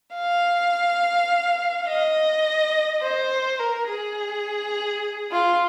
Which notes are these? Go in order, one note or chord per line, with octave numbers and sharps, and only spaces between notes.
F5
D#5
C5
A#4
G#4
F4